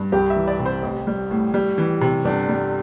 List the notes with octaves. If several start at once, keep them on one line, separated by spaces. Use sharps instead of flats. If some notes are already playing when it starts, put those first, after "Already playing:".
Already playing: G2
C2 G4
E5
E3
D5
C3
C5
A1
G3
A2
G3
E3
C3
G1 D4
G3